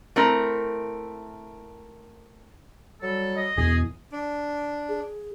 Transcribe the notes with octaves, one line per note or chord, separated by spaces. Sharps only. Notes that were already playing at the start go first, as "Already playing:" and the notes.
A3 C4 E4 A#4
F#3 G3 A4
D#5
E2 B2 E3 G#4
D4
G#4